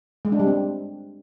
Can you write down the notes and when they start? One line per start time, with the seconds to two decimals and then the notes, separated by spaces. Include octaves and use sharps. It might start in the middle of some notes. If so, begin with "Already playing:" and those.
0.25 G#3
0.32 D4
0.39 G3
0.47 C4